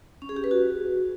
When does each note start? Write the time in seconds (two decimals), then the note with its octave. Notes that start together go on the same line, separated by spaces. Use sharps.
0.22 C#4
0.29 G#4
0.36 G4
0.44 B4
0.51 F#4